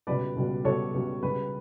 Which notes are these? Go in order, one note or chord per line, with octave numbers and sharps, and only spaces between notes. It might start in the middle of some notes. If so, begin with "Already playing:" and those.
C#2 B2 G3 B4 D5
C#2 B2 G3
C#2 B2 G3 A4 C#5
C#2 B2 G3
C#2 C#3 G3 B4